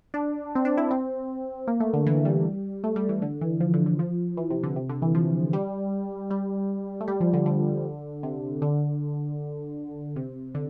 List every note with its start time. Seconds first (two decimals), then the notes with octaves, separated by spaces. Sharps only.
0.14 D4
0.55 C4
0.65 D4
0.77 E4
0.91 C4
1.67 A#3
1.80 A3
1.93 D3
2.06 E3
2.25 G3
2.84 A3
2.96 G3
3.09 E3
3.22 D3
3.41 E3
3.60 F3
3.74 D3
3.86 D3
3.99 F3
4.37 E3
4.50 C3
4.63 D3
4.76 C3
4.89 D3
5.02 E3
5.15 F3
5.53 G3
6.31 G3
7.01 A3
7.08 G3
7.20 F3
7.33 D3
7.46 D3
8.23 C3
8.62 D3
10.16 C3
10.55 D3